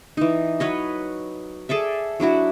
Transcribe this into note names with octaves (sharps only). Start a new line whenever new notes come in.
E3 D#4
F#3 B4 C#5 D#5
G#4 A4 D5 E5
F#3 D4 E4 F#4